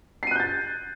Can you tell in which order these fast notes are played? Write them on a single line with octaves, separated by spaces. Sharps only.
C7 D#7 F#6 G6 A6